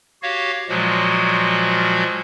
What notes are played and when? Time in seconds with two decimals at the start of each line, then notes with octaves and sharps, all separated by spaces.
0.22 F#4 G4 C#5 F5
0.69 A#2 F3 F#3 G#3 F#4